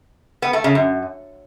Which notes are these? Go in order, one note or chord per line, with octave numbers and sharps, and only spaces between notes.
B3
A3
C#3
F#2